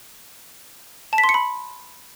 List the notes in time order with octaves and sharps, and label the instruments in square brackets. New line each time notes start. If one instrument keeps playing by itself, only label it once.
[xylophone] A5
B6
C6
C#7
B5